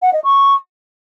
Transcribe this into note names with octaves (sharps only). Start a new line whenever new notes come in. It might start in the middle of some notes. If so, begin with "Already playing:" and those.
F#5
D#5
C#6